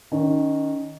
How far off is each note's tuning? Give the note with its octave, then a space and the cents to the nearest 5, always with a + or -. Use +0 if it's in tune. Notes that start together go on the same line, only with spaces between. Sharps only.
D#3 +0 C#4 +20